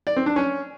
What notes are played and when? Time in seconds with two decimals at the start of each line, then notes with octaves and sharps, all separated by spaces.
0.07 D5
0.16 C4
0.26 D4
0.36 C#4